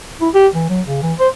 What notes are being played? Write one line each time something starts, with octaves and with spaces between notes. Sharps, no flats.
E4
G4
E3
F#3
C#3
E3
C5